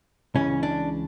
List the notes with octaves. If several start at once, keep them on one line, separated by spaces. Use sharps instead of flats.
C#2 C#3 E3 C#4
D4